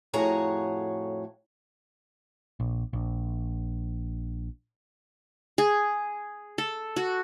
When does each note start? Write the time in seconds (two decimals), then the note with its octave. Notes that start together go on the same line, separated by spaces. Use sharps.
0.13 F2 A2 F#4 G#4 C#5 A#5
2.60 A#1
2.93 A#1
5.58 G#4
6.58 A4
6.96 F#4